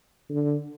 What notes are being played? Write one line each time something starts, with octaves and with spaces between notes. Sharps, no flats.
D3